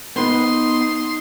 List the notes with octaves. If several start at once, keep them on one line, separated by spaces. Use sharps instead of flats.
B3 D#4 B4 C6